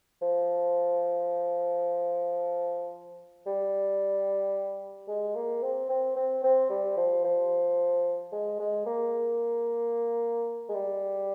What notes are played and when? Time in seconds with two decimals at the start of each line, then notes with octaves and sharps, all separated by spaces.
0.22 F3
3.46 G3
5.08 G#3
5.35 A#3
5.62 C4
5.89 C4
6.16 C4
6.44 C4
6.70 G3
6.97 F3
7.24 F3
8.32 G#3
8.59 G#3
8.86 A#3
10.69 G#3
10.75 G3